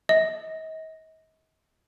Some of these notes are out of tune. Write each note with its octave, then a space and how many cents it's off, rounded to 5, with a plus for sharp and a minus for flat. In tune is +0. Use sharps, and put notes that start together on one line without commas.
D#5 +40